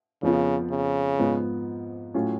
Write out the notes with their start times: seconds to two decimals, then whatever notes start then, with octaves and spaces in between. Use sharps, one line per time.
0.23 F2 C#3 F3 B3 F4
0.71 C#3
1.19 G#2 F3 B3
2.14 A2 F#3 C#4 F4